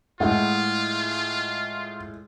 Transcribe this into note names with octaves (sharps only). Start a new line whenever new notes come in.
A2 G#3 E4 F4 F#5